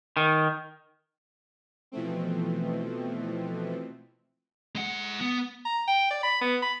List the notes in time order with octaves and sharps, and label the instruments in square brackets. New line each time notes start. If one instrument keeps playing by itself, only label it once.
[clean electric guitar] D#3
[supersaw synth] B2 E3 F3 A3 C4
[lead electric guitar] G#3 F#5
B3
[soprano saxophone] A#5
G5
D5
B5
B3
B5